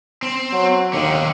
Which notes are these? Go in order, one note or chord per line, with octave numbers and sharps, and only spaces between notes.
C4
F#3
D#2 D3 D#3